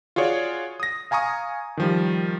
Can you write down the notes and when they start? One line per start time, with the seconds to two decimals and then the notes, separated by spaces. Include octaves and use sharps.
0.16 F4 F#4 G#4 C#5 D5
0.80 D#6 A#6
1.11 F5 G#5 A#5 C#6 D#6
1.77 D#3 F3 G3